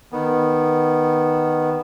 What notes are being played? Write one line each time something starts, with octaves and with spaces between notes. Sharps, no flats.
D#3 B3